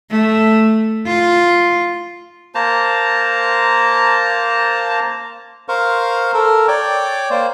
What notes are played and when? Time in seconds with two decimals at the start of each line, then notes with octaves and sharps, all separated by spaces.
0.11 A3
1.06 F4
2.55 A#3 C5 A5 A#5
5.68 A#4 C5 F5 C#6
6.34 A4 A#4
6.68 C#5 D5 G5
7.30 A#3 C5